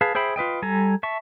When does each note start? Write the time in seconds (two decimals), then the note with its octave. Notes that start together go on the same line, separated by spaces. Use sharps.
0.01 G#4 B4 F5 A5
0.15 G#4 C5 E5 G5 B5
0.36 F4 B4 D#5 G5
0.62 G3 A4 G#5 A#5
1.03 E5 A5 C#6